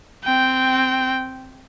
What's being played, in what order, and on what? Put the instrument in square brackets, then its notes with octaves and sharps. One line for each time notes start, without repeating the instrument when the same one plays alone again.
[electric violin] C4 G5